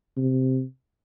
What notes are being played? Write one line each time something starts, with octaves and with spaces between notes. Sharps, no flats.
C3